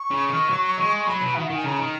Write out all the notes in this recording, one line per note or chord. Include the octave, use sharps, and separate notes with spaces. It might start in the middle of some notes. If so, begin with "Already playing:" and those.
Already playing: C#6
C#3
D#3
F#3
G#3
C#6
F#3 B5
B2
D#3 E5
D#3 F#5
G#5
C#3 A#5
D#3